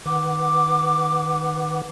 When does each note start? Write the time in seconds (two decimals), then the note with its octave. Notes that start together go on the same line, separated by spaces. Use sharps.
0.06 D#3 B4 F#5 D6